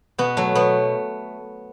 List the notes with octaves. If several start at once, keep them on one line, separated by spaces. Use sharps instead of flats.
B2 B3
F#3 A3
B2 B3